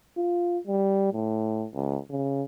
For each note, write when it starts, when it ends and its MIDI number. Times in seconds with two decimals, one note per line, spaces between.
0.17 0.59 65
0.67 1.10 55
1.14 1.65 45
1.74 1.98 37
2.10 2.43 49